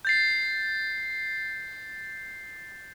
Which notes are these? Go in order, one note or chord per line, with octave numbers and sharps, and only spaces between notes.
G6 A6 C7